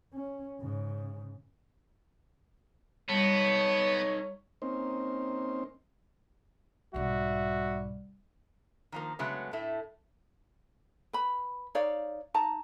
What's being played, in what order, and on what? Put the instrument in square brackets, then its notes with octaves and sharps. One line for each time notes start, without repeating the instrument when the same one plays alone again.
[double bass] C#4
G#2 C#3
[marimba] G3 [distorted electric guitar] B3 [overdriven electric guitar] D#4 A4 [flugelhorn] C#5
[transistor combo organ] A#3 C4 C#4 D#4 C5
[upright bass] B1 G#2 [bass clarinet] G3 [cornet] F#4 [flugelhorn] E5
[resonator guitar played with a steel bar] D#3 F3 A#3
C#3 F#3 G#3 A3 B3
A2 A3 E4
[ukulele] B4 B5
D#4 C#5 D5 F5
D#4 A5 A#5